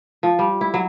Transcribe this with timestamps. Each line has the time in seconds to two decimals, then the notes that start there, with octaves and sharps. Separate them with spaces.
0.23 F3
0.39 G3
0.61 E4
0.74 F#3